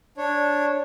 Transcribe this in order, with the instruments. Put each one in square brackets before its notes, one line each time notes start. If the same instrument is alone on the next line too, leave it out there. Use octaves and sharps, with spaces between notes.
[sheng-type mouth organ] D4 C#5